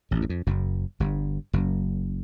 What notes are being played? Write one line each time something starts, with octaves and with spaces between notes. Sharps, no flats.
A1 A2
E2
F2
F#1 F#2
G1 G2
F#1 F#2